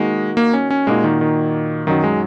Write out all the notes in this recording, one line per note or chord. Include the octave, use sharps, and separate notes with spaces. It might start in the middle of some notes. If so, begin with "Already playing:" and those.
Already playing: D#3 G#3 A#3 D#4 F#4
A#3
C#4
C#4
A#2 G#3 A#3 D#4 F#4
D#3
D#3
F#2 D#3 F#3 D#4 F#4
G#3